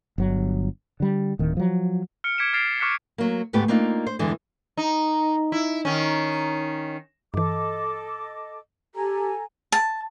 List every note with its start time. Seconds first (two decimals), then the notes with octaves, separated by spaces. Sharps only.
0.18 G1 F#3
1.00 D3 G3
1.39 D1 D#3
1.57 F3 F#3
2.24 F6 C#7 D7
2.38 D6 G#6 B6 C#7 D7 E7
2.53 F6 A6 C7 D7 F7
2.80 C#6 D6 F6 F#6 B6 C#7
3.18 F#3 A#3
3.53 D2 G#2 A3 B3 G4 B4
3.68 A#3 C4 D4 D#4 F4
4.06 C5
4.19 E2 G2 D3 E3 G#3
4.77 D#4
5.52 E4
5.85 D#3 C#4
7.34 G2 E3 A4 D#5 D6
8.95 G4 A4 G#5 A#5
9.72 A5